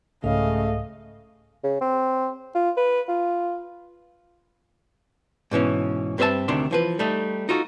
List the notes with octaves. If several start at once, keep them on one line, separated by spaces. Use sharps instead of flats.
C2 G#2 C#3 A3 G#4 D#5 F5
C#3
C4
F4
B4
F4
G#2 B2 E3 C#4
G2 C4 B4 C#5 E5 A5
D2 C3 D#3 D4 C6
E3 F3 B4
G3 A3 D#4
D#4 F4 F#4 A4